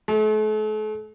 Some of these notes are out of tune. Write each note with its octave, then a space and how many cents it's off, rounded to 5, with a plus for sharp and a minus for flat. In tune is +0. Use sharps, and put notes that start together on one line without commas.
A3 -40